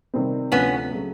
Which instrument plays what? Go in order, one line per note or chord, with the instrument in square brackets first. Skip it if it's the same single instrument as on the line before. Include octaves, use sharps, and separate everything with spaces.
[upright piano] C3 D#3 G3 C4
[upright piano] D2 C3 F3 A3 D4 [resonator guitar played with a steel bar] B3 C#4
[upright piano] C#3 F#3 A3